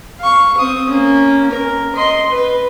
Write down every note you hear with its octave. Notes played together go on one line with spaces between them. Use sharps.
F5 C#6
C4 D#6
A#3 C#4
A#4
D#5 C6
B4